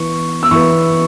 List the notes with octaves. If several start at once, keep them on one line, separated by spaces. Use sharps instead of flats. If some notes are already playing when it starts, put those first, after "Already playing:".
Already playing: E3 B3 C#6
E6
E3 B3 C#6